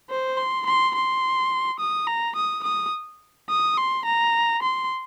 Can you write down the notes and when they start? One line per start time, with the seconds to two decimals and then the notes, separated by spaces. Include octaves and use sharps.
0.10 C5
0.37 C6
0.66 C6
0.95 C6
1.80 D#6
2.07 A#5
2.36 D#6
2.63 D#6
3.49 D#6
3.78 C6
4.05 A#5
4.63 C6